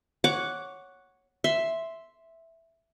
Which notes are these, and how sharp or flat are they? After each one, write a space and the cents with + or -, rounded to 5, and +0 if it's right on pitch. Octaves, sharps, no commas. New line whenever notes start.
C#5 +0 F#5 +0 D6 -20
E5 +0 C6 +0